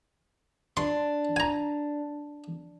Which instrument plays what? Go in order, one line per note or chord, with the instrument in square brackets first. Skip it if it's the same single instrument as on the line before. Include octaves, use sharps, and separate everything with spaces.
[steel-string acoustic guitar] D4 [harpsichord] C6
[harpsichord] G#5 A#5